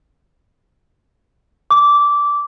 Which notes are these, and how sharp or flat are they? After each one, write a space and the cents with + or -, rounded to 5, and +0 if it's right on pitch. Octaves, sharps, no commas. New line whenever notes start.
D6 -15